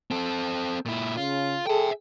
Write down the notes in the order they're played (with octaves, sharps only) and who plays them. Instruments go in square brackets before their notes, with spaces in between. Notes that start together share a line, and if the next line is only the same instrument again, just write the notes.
[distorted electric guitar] C4 A4
A#2 E4
[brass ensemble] C#3 [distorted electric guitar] F4
[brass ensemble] G#4 A4 [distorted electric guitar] E5 G5